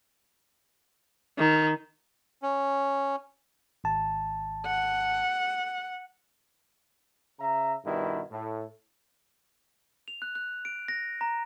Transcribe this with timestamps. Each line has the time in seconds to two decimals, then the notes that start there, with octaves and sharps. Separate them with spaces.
1.38 D#3
2.42 C#4
3.84 G#1 A5
4.66 F#5
7.39 C#3 E5 A#5
7.85 G2 B2 D#3 G3 E4
8.31 A2
10.08 F7
10.22 F#6
10.35 F#6
10.65 D7
10.88 A#6
11.21 A#5